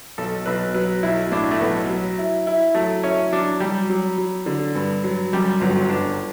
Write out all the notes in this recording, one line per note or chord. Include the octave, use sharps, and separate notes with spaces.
B1 A4
B1 B4
F#3 B4
B1 E4
A2 D4
A3
B1 B3
F#3
E4
E4
F#3 A3
C#4 E4
F#3 D4
F#3 G3
F#3
F#3
D3
G2
F#3
F#2 G3
G1 F#3
G1 D4